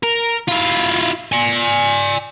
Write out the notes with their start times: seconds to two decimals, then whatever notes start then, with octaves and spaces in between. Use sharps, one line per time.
0.03 A#4
0.48 E4 F4
1.32 D5 G#5